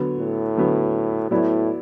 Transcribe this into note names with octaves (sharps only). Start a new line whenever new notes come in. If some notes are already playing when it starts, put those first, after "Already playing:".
Already playing: D3 F#3 B3
A2
D3 F#3 B3
A2 F#3 B3 E4 D5